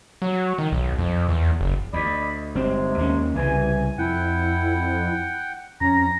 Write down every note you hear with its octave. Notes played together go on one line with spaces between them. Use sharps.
F#3
D#3
B1
F2
E2
F#1
D2 D5 D#5 B5
G1 C3 G#3 C4
D#2 A#3 C#4
C2 C#3 E3 G3 G#5
F2 E4 F#5 G5
F2 C#4 A#5